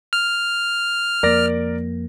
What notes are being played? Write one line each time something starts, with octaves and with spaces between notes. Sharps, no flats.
F6
F2 A#3 A#4 D5 A#6